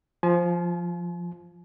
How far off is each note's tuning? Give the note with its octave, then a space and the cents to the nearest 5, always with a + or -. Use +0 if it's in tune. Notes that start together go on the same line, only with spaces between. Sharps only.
F3 +0 G#5 +45